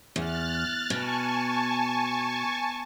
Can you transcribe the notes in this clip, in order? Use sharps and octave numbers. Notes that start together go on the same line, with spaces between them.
E2 F6 F#6 A6
B2 G#5 A5 C#6